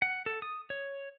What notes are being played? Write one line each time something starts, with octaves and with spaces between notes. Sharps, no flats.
F#5
A4
D#6
C#5